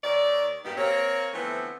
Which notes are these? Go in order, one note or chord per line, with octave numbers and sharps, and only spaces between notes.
D#2 D#3 C#5 D5
G2 A#2 B3 D#4 G4
A#3 C4 C#5
D3 E3 F3 A3 B3 C4